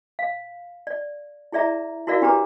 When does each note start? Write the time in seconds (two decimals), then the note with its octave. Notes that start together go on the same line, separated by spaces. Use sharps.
0.19 F5
0.87 D5
1.52 E4 G#4 D5 E5 A#5
2.07 E4 F#4 A#4 D5 F5
2.22 D4 G4 B4 A#5 D6